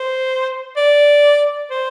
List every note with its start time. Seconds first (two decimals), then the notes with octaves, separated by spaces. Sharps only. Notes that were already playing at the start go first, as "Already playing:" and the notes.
Already playing: C5
0.77 D5
1.70 C5